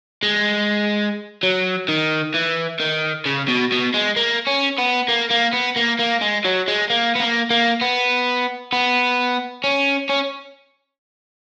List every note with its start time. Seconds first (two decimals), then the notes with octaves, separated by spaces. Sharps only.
0.23 G#3
1.43 F#3
1.89 D#3
2.34 E3
2.80 D#3
3.26 C#3
3.48 B2
3.72 B2
3.94 G#3
4.16 A#3
4.47 C#4
4.78 B3
5.09 A#3
5.31 A#3
5.53 B3
5.77 A#3
5.99 A#3
6.22 G#3
6.45 F#3
6.68 G#3
6.90 A#3
7.15 B3
7.20 A#3
7.51 A#3
7.82 B3
8.73 B3
9.64 C#4
10.09 C#4